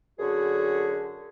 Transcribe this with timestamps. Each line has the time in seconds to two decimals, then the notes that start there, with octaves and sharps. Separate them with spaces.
0.19 F#2 D3 F#4 G#4